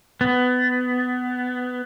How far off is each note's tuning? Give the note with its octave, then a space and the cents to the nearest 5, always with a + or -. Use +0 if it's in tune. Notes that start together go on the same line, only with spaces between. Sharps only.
B3 +20